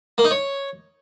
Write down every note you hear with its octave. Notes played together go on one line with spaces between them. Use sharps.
A#3
D#4
C#5